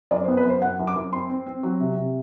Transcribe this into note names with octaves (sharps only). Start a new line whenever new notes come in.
F#2 D5
C5
B3
B4
F#2 C5
F#2 F#5
F#2
D6
F#2
C4 C6
C4
C4
F#3
C3
C3